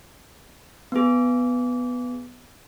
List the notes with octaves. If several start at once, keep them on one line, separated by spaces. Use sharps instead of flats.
B3 G#4